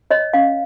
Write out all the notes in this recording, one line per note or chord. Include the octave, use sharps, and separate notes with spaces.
C#5 D#5
C#4 F5